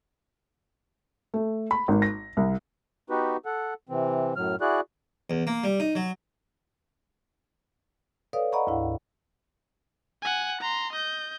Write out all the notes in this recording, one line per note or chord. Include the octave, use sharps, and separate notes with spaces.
A3
B5
G#1
A#6
C2
B3 D#4 F#4 G4 B4
A4 F#5
C3 E3 C4
F#2 A2 F#3 F6
E4 F#4 G#4 D5 F#6
E2
A#3
G3
D#4
F#3
A4 B4 C#5 D5 F5 D#6
D5 D#5 F#5 A#5 B5 C#6
D2 G#2 E4 F5
F#5 G#5
A#5 C6
D#5 G6